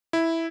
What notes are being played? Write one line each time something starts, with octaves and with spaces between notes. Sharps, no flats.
E4